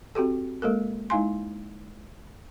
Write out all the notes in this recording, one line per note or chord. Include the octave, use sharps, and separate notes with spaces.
C4 F#4 G4 A4
G#3 A#3 A4 A#4
G#3 D#4 E4 F5 G#5 C6